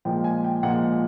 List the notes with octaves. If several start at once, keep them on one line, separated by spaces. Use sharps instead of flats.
A#2 F3 G#3 G5
G#5
G5
A#2 F3 G#3 F#5